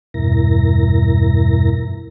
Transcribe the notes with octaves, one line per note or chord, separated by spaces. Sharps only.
E2 G2 B2 E4 A#4 A#6